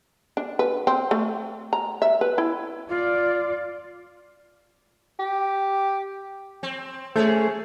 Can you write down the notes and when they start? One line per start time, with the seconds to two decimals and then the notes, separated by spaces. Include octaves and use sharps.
0.37 D4
0.59 B4
0.87 C4
1.11 A3
1.73 A#5
2.02 E5
2.21 B4
2.38 E4
2.89 F4 D5
5.19 G4
6.63 C4
7.16 A3 C#4 G#4 C5